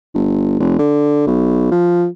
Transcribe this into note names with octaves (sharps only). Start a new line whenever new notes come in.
G1
F1
D3
B1
F3